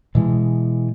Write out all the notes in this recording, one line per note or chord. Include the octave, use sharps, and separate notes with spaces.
B2 E3 G#3